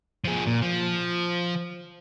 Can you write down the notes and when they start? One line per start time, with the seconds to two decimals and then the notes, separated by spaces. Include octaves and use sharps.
0.25 F3 G#4
0.47 A#2
0.62 F3